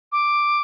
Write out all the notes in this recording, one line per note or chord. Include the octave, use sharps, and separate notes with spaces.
D6